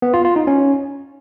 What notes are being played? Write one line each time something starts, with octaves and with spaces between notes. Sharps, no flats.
B3
F4
F4
D#4
C#4